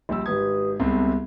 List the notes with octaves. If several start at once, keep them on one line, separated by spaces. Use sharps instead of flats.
A#1 G3 E6
G#1 G4 B4 D#6 G#6
C2 C3 G#3 B3 C4